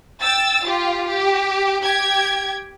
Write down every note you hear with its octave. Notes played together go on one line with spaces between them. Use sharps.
G5 E6 A6
F4 G4
G4
G4 G5 G#6